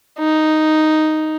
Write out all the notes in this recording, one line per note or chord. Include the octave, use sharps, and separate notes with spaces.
D#4